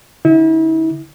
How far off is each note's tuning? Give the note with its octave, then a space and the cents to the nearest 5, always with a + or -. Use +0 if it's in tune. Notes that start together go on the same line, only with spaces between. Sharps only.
D3 -20 E4 -40